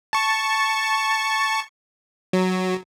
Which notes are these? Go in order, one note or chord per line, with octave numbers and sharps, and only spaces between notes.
A5 C#6
F#3